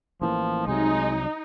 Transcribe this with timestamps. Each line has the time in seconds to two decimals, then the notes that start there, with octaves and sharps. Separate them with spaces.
0.22 A1 E3 F3 A#3
0.66 C2 C3 F#3 G#3 D#4